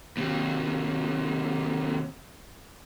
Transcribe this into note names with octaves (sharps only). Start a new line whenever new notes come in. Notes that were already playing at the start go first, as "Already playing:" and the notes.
D#2 C3